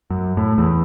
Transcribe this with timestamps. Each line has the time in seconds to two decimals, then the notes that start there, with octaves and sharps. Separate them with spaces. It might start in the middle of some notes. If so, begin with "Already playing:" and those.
0.10 F#2
0.37 A2
0.58 E2